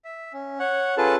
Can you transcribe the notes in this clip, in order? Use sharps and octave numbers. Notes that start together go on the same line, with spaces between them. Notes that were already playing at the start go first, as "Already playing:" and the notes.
E5
C#4
C#5 F#5
C#4 F4 G#4 A4 B4 A5